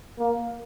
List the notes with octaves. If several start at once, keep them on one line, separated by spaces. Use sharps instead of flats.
A#3